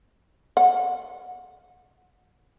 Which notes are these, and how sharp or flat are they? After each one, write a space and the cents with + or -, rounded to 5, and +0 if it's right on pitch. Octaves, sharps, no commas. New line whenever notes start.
F#5 -25